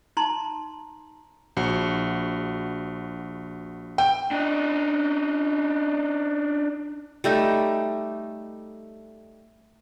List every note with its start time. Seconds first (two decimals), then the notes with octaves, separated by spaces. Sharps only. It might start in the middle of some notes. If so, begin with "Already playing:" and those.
0.17 D#4 A5 A#5 C6
1.57 A#1 F#4 C#7
3.98 G5
4.31 D4 D#4
7.24 G3 A3 D#4